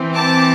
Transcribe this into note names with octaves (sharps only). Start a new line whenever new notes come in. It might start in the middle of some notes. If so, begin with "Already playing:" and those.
Already playing: E3 C4
A5 D6